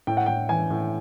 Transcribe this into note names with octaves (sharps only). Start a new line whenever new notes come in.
A2 G5
F#5
A2 G5
E3 G#5
A2